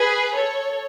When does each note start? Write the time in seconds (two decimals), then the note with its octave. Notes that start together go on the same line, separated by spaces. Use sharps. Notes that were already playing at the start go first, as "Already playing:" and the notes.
Already playing: G#4 B4
0.34 A4 C#5